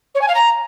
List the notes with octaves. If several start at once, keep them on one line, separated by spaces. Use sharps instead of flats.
C#5
G#5
F5
A#5